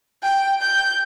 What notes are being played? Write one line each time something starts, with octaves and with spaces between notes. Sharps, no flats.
G5
G6